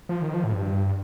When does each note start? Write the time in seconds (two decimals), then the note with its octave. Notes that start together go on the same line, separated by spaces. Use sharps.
0.09 F3
0.22 D#3
0.34 F3
0.44 A2
0.52 G2